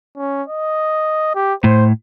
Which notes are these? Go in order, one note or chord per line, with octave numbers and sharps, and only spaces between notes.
C#4
D#5
G4
A2 C5